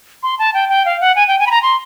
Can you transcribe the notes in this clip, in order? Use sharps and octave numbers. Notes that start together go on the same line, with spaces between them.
C6
A5
G5
G5
F5
F#5
G#5
G5
G#5
B5
A#5
C6